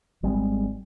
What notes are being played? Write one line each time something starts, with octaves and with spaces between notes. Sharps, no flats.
G#1 G3 G#3 C4